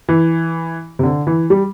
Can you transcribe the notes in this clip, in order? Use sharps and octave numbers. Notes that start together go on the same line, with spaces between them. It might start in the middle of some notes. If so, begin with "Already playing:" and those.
E3
C3
D3
E3
G3